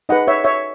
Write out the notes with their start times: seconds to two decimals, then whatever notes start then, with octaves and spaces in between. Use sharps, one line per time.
0.09 D#4 G#4 B4 D#5 F#5
0.27 C#5 E5
0.44 C#5 E5